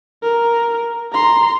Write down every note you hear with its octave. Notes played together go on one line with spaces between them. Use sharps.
A#4
A#5 C6